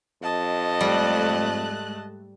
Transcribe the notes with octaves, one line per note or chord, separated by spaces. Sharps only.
F2 D#5 A5
G#2 G3 A3 F#6